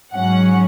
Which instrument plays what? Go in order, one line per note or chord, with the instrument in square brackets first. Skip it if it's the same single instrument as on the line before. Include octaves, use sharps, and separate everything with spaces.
[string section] G#2 F#3 C#4 F#5